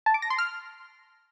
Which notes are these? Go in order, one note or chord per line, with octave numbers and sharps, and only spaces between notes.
A5
D6
A#6
C6
F6